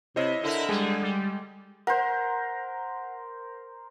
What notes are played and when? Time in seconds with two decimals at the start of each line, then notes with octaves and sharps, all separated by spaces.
0.16 C3 E4 C5 C#5 D#5
0.44 D3 E4 A#4 E5
0.69 G3 G#3 G#4
1.02 G3
1.87 A#4 C5 F#5